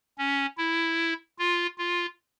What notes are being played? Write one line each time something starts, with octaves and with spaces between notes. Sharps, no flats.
C#4
E4
F4
F4